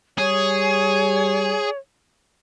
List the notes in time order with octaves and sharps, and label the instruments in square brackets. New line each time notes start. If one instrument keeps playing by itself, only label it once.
[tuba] G3 [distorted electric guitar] G#4 [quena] C#5